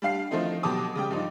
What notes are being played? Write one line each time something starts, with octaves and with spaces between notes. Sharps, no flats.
G3 D4 F5 C7
D#3 F3 A3 C4 D#4 E4
B2 F#3 G4 A5 D6 D#6
C#3 G3 G5
G2 F3 D#4